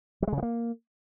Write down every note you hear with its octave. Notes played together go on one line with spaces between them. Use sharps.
F#3
G#3
C#3
F3
A#3